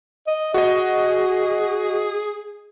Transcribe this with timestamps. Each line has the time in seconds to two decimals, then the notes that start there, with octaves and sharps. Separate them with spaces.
0.27 D#5
0.54 F#4 G#4 D#5